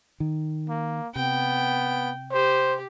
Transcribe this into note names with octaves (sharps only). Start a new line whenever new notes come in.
D#3
A#3
C3 B3 G5
G4 C5